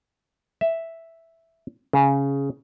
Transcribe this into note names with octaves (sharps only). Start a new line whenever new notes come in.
E5
C#3